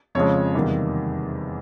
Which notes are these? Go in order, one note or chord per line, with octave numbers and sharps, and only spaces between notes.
F2 C#3 F3 G#3 C#5
E2 C3 D#3 G3 A#3